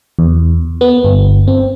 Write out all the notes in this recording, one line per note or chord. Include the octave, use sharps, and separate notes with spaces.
E2
B3
G1
C4